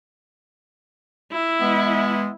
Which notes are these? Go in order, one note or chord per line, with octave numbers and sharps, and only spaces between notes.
E4
E3 G#3 B3